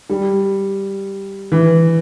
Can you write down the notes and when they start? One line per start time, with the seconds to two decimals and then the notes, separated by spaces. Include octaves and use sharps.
0.09 G3
1.52 E3